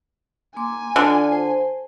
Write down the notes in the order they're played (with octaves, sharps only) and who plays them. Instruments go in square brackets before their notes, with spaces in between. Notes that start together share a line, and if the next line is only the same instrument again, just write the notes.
[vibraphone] A#3 C6 D6 [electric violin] G#5
[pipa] D3 [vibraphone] F4 D5
[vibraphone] C5